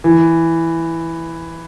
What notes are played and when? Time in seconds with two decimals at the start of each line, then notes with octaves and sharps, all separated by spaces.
0.04 E3